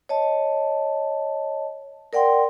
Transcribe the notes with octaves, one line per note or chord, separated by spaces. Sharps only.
C#5 D#5 A5
A#4 D5 F#5 G5 C6